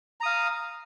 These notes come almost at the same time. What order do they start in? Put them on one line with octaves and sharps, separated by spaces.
A#5 D#6 F5